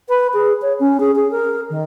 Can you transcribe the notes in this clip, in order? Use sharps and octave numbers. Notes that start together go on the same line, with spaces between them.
B4
G#4
C#5
C#4
G#4
G#4
A#4
D#3